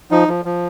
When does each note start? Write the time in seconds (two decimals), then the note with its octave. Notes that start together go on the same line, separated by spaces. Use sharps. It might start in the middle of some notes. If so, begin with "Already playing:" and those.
0.11 F3 D#4
0.28 F3
0.45 F3